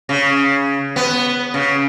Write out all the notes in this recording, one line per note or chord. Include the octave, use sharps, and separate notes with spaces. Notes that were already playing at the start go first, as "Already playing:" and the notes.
C#3
B3
C#3